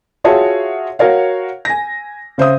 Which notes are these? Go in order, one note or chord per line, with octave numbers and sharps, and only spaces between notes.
F4 F#4 G#4 C#5 E5 A5
F#4 A#4 C#5 F5
G#5 A#6
C#3 C5 E5 D#6